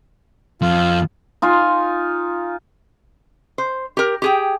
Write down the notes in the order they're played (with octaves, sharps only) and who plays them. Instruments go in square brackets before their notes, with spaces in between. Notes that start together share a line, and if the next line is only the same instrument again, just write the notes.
[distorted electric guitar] F2 [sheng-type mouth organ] F4
[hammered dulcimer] D#4 F4 G#5
[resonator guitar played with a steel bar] C5
G4 A#4
G4 G#4 G5